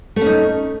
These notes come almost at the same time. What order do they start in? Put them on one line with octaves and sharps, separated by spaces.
A3 C#4 D#4